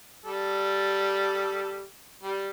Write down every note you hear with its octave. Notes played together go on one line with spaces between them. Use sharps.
G3 A4
G3